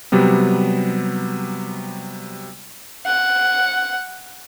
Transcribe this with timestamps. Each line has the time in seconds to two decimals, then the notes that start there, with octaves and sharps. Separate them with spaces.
0.12 C3 F#3 G3 B3
3.06 F#5